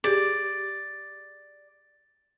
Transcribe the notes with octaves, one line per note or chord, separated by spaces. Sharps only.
G4 G#4 D5